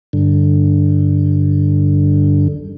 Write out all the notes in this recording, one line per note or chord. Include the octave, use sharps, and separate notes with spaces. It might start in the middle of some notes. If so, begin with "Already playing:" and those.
G2 D3